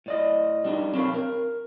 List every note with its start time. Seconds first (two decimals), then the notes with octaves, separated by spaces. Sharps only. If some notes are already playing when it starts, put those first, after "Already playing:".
0.06 A2 D5 D#5
0.64 G3 D4 D#4
0.93 B1 C4 G4 A#4 C#5 F5
1.14 A#4